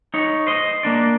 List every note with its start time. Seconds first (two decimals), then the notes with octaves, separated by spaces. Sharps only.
0.14 D#4 C#5
0.47 C5 D#5
0.83 A#3 D4 D5